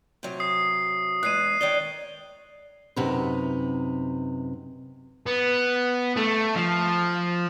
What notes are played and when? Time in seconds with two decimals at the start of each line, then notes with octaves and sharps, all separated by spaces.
0.23 C3 F#3
0.40 D#6 C7
1.23 E2 G#3 F#6 C7 D#7
1.61 D#3 C#5 D5 G7
2.96 F#2 C3 D#4 B4
5.26 B3
6.17 A3
6.55 F3